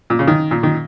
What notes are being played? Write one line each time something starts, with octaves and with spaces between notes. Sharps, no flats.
A#2
C#3
D#3
A#2
D#3